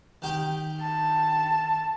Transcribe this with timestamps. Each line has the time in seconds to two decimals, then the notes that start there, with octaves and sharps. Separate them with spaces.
0.22 D#3 G4 G5
0.81 A5